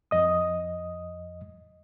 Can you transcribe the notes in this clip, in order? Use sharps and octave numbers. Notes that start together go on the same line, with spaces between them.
F2 D#5 D#6